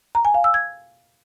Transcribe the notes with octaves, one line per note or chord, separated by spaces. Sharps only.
A#5
G#5
F5
E6
G#6